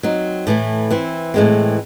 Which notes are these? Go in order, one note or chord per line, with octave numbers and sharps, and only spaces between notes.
F#3 C4 D#4
A2 E3 A3
E3 C4 E4
A2 E3 G#3 C4